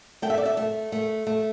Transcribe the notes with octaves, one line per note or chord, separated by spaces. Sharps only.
A3 G5
E5
D5
E5
A3
A3
A3